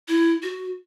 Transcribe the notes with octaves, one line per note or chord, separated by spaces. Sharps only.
E4
F#4